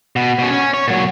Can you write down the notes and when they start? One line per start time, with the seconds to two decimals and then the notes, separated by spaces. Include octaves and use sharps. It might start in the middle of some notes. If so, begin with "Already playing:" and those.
0.16 B2
0.39 B2 C#4
0.51 C#4
0.74 C#5
0.88 A#2 F#3